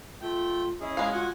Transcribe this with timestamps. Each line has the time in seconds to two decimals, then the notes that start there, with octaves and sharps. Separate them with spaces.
0.21 A3 F4 G5
0.81 C#4 E4 G#4 D#5
0.97 G#3 F5
1.12 F4 F#4 F#5 G#5